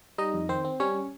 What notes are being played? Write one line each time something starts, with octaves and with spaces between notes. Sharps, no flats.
G3 D#4 D#5
F2
D#3 C4 C5
C4
G3 C#4 C#5